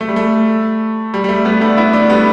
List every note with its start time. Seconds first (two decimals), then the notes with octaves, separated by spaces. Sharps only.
0.01 A3
0.09 G3
0.16 A3
1.14 G3
1.24 G3
1.29 A3
1.45 G3 B3
1.61 A3 D4
1.77 B3 E4
1.93 A3 D4
2.10 G3 B3